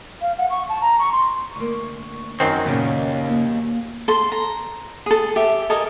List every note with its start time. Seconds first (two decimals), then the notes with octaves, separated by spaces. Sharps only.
0.22 F5
0.38 F#5
0.50 C#6
0.69 A5
0.81 A#5
0.99 C#6
1.12 C6
1.56 D2 A#3 C#6
2.40 F#2 D#3 F#3 C4 C#5
2.65 D#2 A#2 C#3 B3
3.30 A#3
4.08 A4 C6
4.32 A#5
5.06 G#4 A4
5.36 G4 E5
5.70 A4 A#4 D#5 G#5